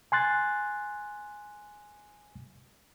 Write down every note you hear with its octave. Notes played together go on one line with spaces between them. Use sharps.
G#5 C6 F#6 A6